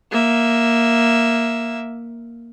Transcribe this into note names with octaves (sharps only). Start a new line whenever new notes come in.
A#3 E5